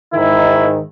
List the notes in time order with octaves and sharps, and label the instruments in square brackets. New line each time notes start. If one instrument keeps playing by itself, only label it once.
[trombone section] G#2 D#3 [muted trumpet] E4